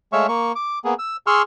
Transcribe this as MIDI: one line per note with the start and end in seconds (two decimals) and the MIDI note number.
0.13 0.27 56
0.13 0.27 57
0.13 0.27 73
0.13 0.27 76
0.13 0.27 77
0.13 0.27 85
0.28 0.52 58
0.28 0.52 85
0.55 0.79 86
0.85 0.94 58
0.85 0.94 59
0.85 0.94 68
0.99 1.17 88
1.27 1.42 68
1.27 1.42 84
1.27 1.42 85
1.27 1.42 88
1.27 1.42 89